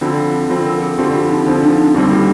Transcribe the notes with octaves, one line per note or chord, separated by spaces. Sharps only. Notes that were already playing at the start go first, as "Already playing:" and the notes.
D3 F3 C4 F4
D3 F3 C4 F4
A#4
G#4
D3 F3 C4 G4
F4
D#4
D3 F3 C4 D#4
D4
D#4
D#2 D3 G3 C4 G4
F4